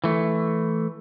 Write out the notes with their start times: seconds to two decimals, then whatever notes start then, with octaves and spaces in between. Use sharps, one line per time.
0.04 E3 A3